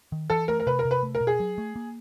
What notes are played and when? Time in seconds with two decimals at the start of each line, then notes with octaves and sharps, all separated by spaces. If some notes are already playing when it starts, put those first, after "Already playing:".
0.12 D#3
0.30 E3 A4
0.48 A3 A#4
0.60 A#4
0.67 C3 B4
0.79 A#4
0.85 C3
0.91 B4
1.03 A3
1.15 A#4
1.21 B2
1.27 G#4
1.40 F#3
1.58 A3
1.76 A#3